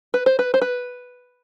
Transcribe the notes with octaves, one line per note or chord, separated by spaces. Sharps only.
B4
C5
B4
C5
B4